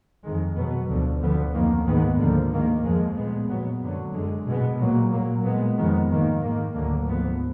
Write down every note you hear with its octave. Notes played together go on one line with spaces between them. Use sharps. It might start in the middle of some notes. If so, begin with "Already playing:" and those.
F2 D#3 G#3
B2 F#3 B3
D2 D3 F3
D2 D3 F3 B3
F2 D#3 A#3
G#2 D#3 G#3 B3
D2 D3 F3 A#3
G#2 D#3 A#3
F2 F3 G#3
A#2 G#3 B3
A#2 F#3 B3
F#2 D3 F#3
F#2 D3 G#3
B2 G#3 B3
A#2 F#3 A#3
A#2 F#3 A#3
A#2 G#3 B3
F2 D#3 G#3 B3
G#2 D#3 A#3
G#2 D#3 A#3
D2 D3 F#3 A#3
G#2 F3 B3